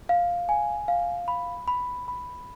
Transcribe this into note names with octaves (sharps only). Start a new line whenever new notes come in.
F5
G#5
F5
B5
B5
B5